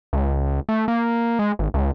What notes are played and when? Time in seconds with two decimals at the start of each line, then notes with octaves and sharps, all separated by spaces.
0.13 C#2
0.69 A3
0.88 A#3
1.39 G#3
1.59 G#1
1.74 C#2